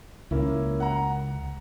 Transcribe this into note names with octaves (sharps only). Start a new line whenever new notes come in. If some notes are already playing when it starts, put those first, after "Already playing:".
C#2 A#3 C#4 E4
F#5 A#5